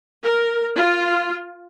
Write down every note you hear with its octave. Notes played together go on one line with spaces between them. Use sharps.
A#4
F4